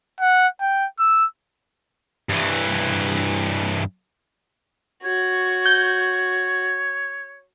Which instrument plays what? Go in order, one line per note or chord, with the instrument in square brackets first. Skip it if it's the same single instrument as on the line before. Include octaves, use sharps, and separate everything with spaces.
[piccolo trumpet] F#5
G5
E6
[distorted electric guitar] G2 E3
[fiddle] F#4 [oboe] C#5
[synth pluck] G6